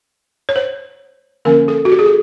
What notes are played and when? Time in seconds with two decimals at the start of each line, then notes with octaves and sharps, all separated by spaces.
0.49 C#5
0.56 C5
1.45 D3 F3 A#3 C#4 A#4
1.68 A4
1.85 F#4
1.92 G4
1.99 G#4
2.06 A4